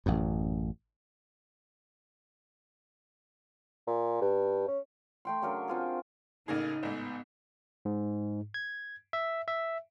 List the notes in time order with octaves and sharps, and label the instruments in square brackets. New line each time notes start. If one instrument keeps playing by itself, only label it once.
[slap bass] A1 F#2
[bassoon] A#2
G2
C#4
[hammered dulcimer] A3 G5 C6
C#3 F#3 D4 A#4
C4 F4 G#4
[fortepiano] A1 A#3 G#4 [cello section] C#3 D#4
[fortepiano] A1 G#2 [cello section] B3
[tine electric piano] G#2
G#6
E5
E5